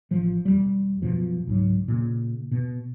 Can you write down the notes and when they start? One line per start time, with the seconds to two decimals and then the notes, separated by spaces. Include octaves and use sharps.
0.11 A1 F3
0.45 E1 C2 G3
1.02 F#2 B2 F3
1.47 C#2 G#2 F#3
1.88 A#2 C#3
2.51 B2